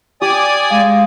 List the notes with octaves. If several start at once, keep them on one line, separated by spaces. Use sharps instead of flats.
G4 D5 G#5 D#6
G#3 F5